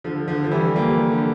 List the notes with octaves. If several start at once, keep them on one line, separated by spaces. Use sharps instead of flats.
D3 F3
D3 F3
F3
E3 G3
G3 A#3
D3